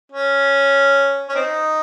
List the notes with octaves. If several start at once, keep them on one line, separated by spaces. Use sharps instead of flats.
C#4
C#4
C4 D#4